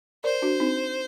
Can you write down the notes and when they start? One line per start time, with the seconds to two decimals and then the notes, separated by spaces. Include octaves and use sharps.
0.24 A#4 C5 D5
0.42 D4 F#4
0.60 C4 D#4